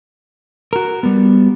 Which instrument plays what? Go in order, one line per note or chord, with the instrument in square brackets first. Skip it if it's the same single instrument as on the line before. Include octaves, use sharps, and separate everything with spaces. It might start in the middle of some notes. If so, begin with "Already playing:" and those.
[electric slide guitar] F#4 A#4
G3 B3